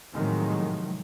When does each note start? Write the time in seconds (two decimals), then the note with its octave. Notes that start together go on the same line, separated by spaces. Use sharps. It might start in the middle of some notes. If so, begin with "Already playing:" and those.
0.13 A2 C3 D#3 F3 F#3 G#3